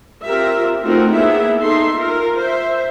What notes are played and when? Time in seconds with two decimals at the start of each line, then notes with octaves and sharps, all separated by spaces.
0.25 C4 F4 G4 A#4 E5
0.83 A3 C4 D#4 F4 F#4 A#4
1.13 A#3 B3 E4 G#4 E5
1.60 D#4 A4 E5 C6
1.97 F4 A#4
2.38 C5 E5